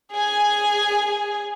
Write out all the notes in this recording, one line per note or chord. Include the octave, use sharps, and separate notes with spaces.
G#4 G#5